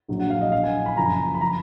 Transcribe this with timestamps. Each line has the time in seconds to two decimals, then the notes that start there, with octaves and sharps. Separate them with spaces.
0.08 A#1 A#2 F#3
0.20 F#5
0.30 F5
0.41 D#5
0.52 A#1 A#2 F#3 F5
0.64 G#5
0.86 B5
0.97 F#1 F#2 F3 A#5
1.35 B5
1.41 F3 A#5